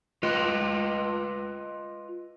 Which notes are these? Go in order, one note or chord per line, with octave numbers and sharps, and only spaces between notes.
F4 B4 D#5